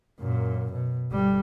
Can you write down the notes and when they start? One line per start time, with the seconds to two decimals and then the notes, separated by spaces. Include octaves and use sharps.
0.20 F#2 A#2
0.73 B2
1.11 G1 G3